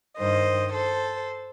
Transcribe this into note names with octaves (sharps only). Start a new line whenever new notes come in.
G2 D#3 C5 D#5
A4 C5